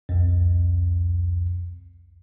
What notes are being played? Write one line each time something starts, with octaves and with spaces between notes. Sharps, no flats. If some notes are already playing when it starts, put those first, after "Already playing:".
C2 F2